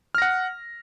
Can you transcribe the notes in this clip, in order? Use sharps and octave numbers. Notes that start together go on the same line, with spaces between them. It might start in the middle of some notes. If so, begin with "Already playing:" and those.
F#5 F6 A#6